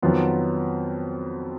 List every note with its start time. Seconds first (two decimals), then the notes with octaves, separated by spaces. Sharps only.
0.02 F2 D#3 F#3 B3 F4